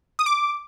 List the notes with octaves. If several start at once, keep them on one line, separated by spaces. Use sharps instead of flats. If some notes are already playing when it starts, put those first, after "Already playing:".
D#6
D6